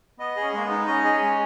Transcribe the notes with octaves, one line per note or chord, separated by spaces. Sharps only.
B3 D#5
G#4
C#4
G#3 A#3
B3
D#4
C#4 D#5
G#4
G#3